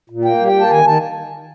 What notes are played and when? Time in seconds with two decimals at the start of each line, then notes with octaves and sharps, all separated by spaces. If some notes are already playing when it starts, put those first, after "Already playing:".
0.10 A#2
0.25 A#3 G5
0.40 G3
0.48 G5
0.56 A#3 A5
0.71 D#3 G#5
0.86 D#3 A5